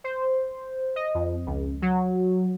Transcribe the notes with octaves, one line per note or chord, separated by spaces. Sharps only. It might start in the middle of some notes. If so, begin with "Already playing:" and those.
C5
D#5
F2
C#2
F#3